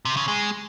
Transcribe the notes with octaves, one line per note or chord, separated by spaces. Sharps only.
C3
C#3
G#3